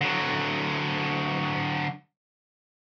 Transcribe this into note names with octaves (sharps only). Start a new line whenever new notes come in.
D3 F#3